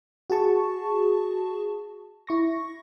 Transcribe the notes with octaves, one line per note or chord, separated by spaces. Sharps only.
F#4 G#4 A5 C#6
E4 C#6 A#6